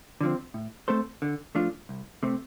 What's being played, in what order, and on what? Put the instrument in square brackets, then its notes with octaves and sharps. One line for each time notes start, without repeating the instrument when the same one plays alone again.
[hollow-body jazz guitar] D3 F3 C4
A2
A3 C4 A4 C5
D3
F3 A3 D4 F4
C2
C3 A3 C4